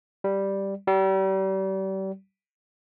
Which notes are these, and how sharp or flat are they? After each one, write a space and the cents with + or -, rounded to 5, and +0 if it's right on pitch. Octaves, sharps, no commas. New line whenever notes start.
G3 +0
G3 -35